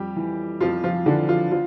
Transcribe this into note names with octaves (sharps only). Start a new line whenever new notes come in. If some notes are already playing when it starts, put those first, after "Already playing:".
Already playing: F2 G3 G4
E3
F2 F3 F4
F3 F4
D3 E3 D4
F3 F4
F3 F4